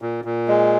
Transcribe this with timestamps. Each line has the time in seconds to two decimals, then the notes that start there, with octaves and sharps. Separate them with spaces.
0.02 A#2
0.25 A#2
0.48 G#3